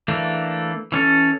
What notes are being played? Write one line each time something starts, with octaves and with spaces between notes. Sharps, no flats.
E3 A3 A#3 D4
E3 C#4 A4